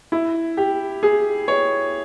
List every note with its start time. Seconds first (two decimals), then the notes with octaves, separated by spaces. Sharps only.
0.12 E4
0.57 G4
1.03 G#4
1.48 C#5